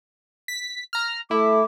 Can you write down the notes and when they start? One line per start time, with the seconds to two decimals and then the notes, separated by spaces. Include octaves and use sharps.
0.48 B6
0.93 A#5 F6
1.31 A3 E4 D6